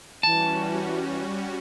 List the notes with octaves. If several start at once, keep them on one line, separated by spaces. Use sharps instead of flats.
E3 G3 C#4 F#4 A5